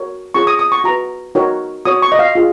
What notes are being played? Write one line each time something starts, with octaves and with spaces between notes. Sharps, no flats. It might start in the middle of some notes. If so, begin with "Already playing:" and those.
Already playing: F#4 A#4 C#5
C#4 F4 G#4 C#5 C#6
D#6
D#6
C#6
F#4 B4 A#5
D#4 F#4 A#4 C#5
F#4 C#5 D#6
C#6
D#5
F5
F4 G#4